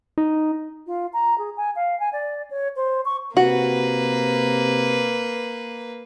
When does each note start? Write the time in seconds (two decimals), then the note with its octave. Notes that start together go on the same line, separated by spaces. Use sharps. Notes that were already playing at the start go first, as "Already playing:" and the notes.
0.18 D#4
0.87 F4
1.13 A#5
1.38 G#4
1.57 G#5
1.76 F5
2.00 G#5
2.13 D5
2.51 C#5
2.76 C5
3.05 C#6
3.37 C3 A#3 F#4 B4